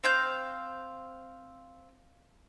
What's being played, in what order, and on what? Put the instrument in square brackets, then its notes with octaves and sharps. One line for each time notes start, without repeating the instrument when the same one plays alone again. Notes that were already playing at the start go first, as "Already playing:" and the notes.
[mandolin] C4 F5 G6